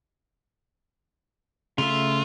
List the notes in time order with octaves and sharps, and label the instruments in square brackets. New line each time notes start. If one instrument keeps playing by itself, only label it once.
[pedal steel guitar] C#3 A3 E5 [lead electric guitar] F4